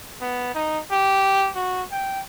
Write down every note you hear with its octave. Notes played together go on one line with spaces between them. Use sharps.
B3
D#4
G4
F#4
G5